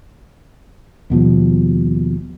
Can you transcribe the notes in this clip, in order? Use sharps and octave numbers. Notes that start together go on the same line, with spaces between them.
D#2 B2 F3 G3